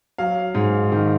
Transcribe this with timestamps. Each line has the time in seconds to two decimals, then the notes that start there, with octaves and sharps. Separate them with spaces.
0.18 F#3 F5
0.55 G#2
0.92 D#3